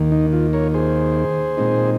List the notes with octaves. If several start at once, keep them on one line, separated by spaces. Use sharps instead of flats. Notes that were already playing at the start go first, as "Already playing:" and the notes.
Already playing: D#2 D#3 A#3
D#4
F4
A#4 C#5
G#4 C5
A#2 G#3 C4 D#4